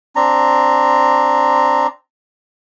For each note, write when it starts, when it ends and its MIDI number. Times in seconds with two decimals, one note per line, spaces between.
0.16 1.87 60
0.16 1.87 62
0.16 1.87 82